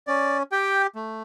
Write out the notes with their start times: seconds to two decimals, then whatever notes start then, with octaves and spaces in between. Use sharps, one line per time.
0.07 C#4 D5
0.52 G4 G5
0.95 A3